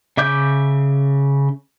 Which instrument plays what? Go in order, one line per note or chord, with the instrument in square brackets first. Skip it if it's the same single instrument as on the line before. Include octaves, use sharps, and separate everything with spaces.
[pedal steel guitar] C#3 E5 D6 G6